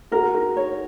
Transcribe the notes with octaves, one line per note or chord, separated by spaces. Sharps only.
F#4 G#4 A#4
D#4
C#5